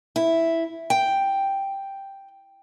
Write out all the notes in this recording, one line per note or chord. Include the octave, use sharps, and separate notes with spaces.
E4
G5